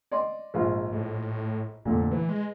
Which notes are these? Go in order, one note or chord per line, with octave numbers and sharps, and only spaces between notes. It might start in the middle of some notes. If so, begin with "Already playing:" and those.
D5 D#5 C6
A#1 G#2 F4
A2
F2 A#2 D3 A3
E3 B4
G#3